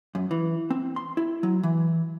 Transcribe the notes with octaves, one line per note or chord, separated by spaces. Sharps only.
F#2
E3
C4
C6
E4
F#3
E3